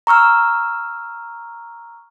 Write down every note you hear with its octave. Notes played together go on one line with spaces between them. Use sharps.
A#5 C#6 E6 F6